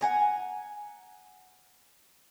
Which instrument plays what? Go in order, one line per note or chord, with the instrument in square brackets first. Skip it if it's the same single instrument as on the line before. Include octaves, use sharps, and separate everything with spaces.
[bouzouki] F#5 G#5 A#5